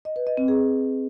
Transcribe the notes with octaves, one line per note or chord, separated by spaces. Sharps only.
D#5
B4
D#5
C4
G#4